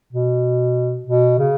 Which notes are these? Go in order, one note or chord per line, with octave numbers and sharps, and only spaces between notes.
B2
B2
C#3